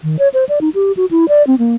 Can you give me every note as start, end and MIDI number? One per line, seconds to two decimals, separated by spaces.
0.03 0.17 51
0.19 0.28 73
0.34 0.45 72
0.49 0.59 74
0.61 0.69 63
0.74 0.92 67
0.97 1.05 66
1.11 1.28 64
1.28 1.45 74
1.47 1.58 60
1.59 1.76 58